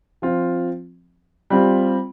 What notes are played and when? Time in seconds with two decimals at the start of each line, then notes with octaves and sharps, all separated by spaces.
0.22 F3 C4 F4
1.50 G3 C4 F4